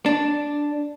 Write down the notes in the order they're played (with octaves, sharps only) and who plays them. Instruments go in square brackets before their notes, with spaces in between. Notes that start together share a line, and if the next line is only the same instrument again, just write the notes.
[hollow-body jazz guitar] D4